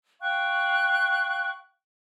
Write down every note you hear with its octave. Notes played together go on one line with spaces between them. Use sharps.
F5 G5 C#6 F#6